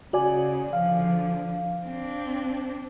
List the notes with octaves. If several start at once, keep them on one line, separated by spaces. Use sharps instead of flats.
C#3 F#4 D5 G#5
D3 F3 F5
C4 D4